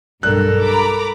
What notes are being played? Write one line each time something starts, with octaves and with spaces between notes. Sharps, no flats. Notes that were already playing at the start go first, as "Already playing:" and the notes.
B1 G2 A4 A#4 F#6
A#5 B5 D6